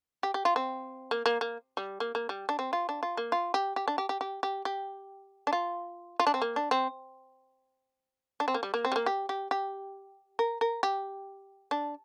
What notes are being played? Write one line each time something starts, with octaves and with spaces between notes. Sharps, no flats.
G4
G4
F4
C4
A#3
A#3
A#3
G3
A#3
A#3
G3
D4
C4
F4
D4
F4
A#3
F4
G4
G4
D4
G4
G4
G4
G4
G4
D4
F4
F4
D4
C4
A#3
D4
C4
D4
C4
A#3
G3
A#3
C4
G3
A#3
G4
G4
G4
A#4
A#4
G4
D4